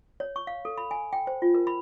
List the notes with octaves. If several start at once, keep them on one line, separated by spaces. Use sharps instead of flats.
C#5
C#6
F5
A4
B5
G#5
G5
C5
F4
A#4
B5